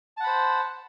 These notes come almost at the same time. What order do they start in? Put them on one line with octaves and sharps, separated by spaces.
A5 F#5 B5 C5